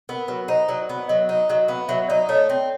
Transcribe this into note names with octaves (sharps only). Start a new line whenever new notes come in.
B3 A#4
F#3 B4
D#4 C5
F#3 D5
B3
F#3 D#5
D#4
F#3 D#5
B3 F5
F#3 E5
D#4 D5
A3 C#5
C4